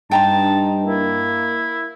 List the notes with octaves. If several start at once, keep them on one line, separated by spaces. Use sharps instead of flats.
G2 D#4 G5 A5 A#5 C6
A#3 E4